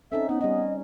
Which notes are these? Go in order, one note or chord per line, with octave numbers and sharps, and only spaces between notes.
C4 C#4 D#4 A4 E5
B3 C#4 D#4
G3 C#4 D#5